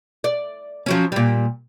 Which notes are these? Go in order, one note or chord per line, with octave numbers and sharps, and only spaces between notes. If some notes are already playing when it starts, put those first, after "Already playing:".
D5
F3 F#3 C#4
A#2 G3